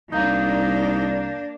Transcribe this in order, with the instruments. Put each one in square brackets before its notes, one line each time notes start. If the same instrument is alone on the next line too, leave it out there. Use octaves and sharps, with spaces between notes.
[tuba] C2 [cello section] A#3 D4 [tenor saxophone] D#4 [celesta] F5 A#5 G6